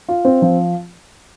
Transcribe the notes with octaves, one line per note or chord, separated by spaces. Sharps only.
F4
C4
F3